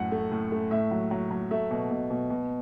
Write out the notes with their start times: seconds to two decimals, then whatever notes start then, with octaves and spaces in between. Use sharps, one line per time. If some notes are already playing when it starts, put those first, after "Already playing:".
Already playing: F#2 A2 F#5
0.12 A3
0.31 A2
0.52 A3
0.71 A2 E5
0.91 F#3
1.11 F#3
1.31 F#3
1.51 A3 E5
1.71 B2
1.91 B2
2.11 B2
2.30 B2